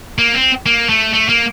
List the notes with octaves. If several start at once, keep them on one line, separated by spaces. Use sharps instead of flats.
A#3
C4
A#3
A3
A3
A#3